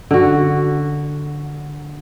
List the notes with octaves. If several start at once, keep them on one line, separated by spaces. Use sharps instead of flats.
D3 F#4